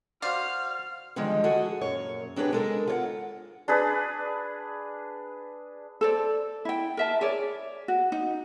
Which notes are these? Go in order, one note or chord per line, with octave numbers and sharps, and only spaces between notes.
F#4 C5 D5 F5 F6
D3 D#3 F3 G3 G#3
F#4 G#4 A4
F#2 A#2 C#5
F#3 D4 G4 G#4 B4
G#3 A4 A#4
F4 C#5 F#5
D4 G#4 B4
A4 C5 D5
E4 G5
A#4 E5 A5
G#4 C#5 D5
F#4
D#4